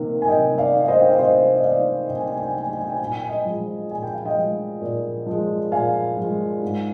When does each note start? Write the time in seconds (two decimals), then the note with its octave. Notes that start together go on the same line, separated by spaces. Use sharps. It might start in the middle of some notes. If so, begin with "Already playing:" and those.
Already playing: C3 D#3 A#3
0.22 G#5
0.27 C3 D#5 G5
0.58 D5 F5
0.74 D#3 A#3
0.84 F5
0.88 C5 D#5
1.01 G5
1.10 F5
1.18 C3 C5 D#5
1.55 D#5
1.64 D#3 A#3 D5 F5
2.09 C3 G5
2.16 G#5
2.25 G5
2.32 G#5
2.39 G5
2.46 G#5
2.55 D#3 A#3 G5
2.61 G#5
2.69 G5
2.77 G#5
2.85 G5
2.92 G#5
2.99 A#2 G5
3.07 G#5
3.14 G5
3.22 G#5
3.29 D#5 G5
3.45 F3 G#3
3.90 A#2 G#5
4.02 G5
4.14 F5
4.25 D#5 G5
4.36 F3 G#3
4.82 A#2
5.26 F3 G#3
5.72 A#2 F5 G#5
6.17 F3 G#3
6.63 G#2